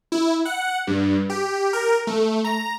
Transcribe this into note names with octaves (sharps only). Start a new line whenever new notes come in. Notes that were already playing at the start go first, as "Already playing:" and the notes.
E4
F#5
G2
G4
A#4
A3
A#5